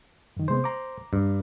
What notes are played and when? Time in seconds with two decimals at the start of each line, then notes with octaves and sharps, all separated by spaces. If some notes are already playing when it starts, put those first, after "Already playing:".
0.37 F#2 D#3
0.48 C3 G#3 B3 C5
0.64 A#5 D6
1.13 G2